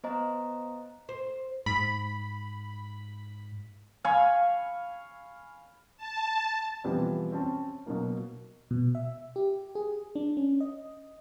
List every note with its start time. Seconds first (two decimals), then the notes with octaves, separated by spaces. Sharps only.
0.04 B3 C5 D#5 A#5
1.09 C5
1.66 G#2 B5
4.04 F5 G#5 B5 C#6
5.97 A5
6.84 B2 E3 F3 G3 B3 C4
7.32 C4 C#4 A5
7.86 B2 F#3 A#3
8.71 B2
8.95 E5
9.36 G4
9.75 G#4
10.15 D4
10.37 C#4
10.60 D#5